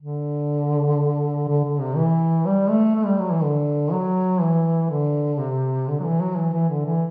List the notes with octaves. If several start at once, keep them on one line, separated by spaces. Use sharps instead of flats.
D3
D3
D3
C3
E3
G3
A3
A3
G3
F#3
E3
D3
F#3
E3
D3
C3
D3
F#3
E3
F#3
E3
E3
D3
E3